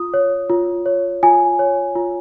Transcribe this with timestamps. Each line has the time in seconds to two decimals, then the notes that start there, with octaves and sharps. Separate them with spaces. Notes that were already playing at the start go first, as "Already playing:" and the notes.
Already playing: F4 D#6
0.14 C#5
0.50 F4
0.86 C#5
1.23 F4 G#5
1.59 C#5
1.95 F4